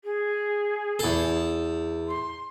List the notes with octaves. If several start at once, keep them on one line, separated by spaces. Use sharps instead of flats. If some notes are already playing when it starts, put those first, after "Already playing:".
G#4
E2 A4
C6